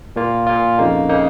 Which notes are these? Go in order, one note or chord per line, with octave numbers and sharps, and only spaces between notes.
A#2 A#3 F4
A#2 A#3 F4
F2 C#3 A#3 D#4
C#3 A#3 D#4